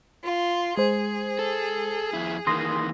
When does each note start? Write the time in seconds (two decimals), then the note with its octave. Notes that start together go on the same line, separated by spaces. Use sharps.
0.23 F4
0.77 G#3 G#4 C5
1.39 A4
2.13 F2 E4
2.47 D#3 E3 A#3 C6 D#6 A#6